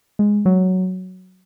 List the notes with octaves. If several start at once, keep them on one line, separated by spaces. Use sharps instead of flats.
G#3
F#3